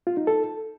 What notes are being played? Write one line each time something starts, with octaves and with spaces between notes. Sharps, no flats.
F4
D#4
A4